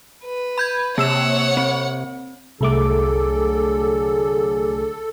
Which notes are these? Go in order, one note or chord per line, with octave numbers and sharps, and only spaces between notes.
B4
B5 G6 G#6
C3 A#3 C#5 F#5 E6 E7
C4
C2 D3 F#3 A3 G#4 A4 D6